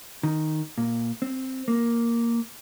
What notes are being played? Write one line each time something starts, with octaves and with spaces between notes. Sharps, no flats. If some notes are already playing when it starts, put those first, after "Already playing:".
D#3
A#2
C4
A#3